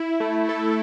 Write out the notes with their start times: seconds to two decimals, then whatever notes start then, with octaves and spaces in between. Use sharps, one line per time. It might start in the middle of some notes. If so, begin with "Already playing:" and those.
Already playing: E4
0.20 A3
0.49 A4